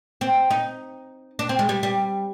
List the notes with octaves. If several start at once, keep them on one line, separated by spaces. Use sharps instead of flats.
C4
D#4
D4
C4
G#3
G3
G3